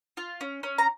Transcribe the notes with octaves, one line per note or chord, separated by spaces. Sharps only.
F4
C#4
C#4
A#5